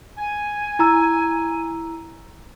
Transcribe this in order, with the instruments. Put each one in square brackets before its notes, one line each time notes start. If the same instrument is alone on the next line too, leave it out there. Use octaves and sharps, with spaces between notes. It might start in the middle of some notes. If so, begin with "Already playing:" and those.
[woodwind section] G#5
[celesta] E4 A#5 E6